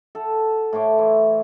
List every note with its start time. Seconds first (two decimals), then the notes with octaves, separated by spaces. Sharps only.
0.15 A4 F#5
0.73 A2 C5 C#5 D6
0.99 E3